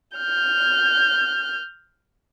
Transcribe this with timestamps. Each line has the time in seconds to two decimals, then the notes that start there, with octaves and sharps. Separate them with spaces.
0.17 F6 G6